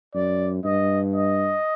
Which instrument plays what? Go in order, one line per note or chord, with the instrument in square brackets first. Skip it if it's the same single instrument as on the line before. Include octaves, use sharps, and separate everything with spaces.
[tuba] F#2 [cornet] D5
[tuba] G2 [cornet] D#5
[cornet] D#5